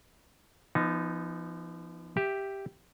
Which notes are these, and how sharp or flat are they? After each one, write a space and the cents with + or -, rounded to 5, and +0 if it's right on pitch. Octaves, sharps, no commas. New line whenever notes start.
F3 -35 B3 +0 D#4 +0
G4 +0 E5 +0